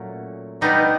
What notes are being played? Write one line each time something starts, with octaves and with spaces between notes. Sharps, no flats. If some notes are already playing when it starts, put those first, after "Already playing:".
Already playing: A#2 F#3 A3 C#4
B2 G3 B3 D4 D#4